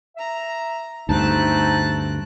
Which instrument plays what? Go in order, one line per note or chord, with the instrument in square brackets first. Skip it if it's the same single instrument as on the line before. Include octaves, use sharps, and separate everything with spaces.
[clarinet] E5 [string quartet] A#5
[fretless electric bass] D2 G2 [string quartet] A3 C4 F#6 [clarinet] D#4 [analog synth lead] A5